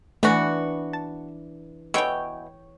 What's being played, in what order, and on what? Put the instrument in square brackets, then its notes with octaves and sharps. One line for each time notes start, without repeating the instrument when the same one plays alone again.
[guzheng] E3 D4 [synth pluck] A3 [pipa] B3 F#4
[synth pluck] A5
[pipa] B2 E3 [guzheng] C#5 G5 [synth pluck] E6 D7